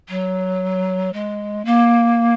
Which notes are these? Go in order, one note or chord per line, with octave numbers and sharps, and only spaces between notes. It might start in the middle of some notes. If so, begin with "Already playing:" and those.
F#3
G#3
A#3